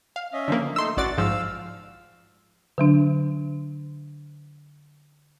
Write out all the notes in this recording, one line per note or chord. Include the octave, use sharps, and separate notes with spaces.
F5
C#4 D#5 E5
D3 F3 A#3
A3 D#4 C6 E6
A1 F#4 D5 F#5 A6
G#2 F3 F5 E6
D3 F#3 D4